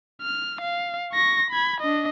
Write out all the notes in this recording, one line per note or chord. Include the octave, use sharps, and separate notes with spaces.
F6
F5
C#6 A#6
B5 G#6
D4 D#5